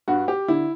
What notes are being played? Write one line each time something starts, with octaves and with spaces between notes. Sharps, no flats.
G2 F#4
G4
D3 E4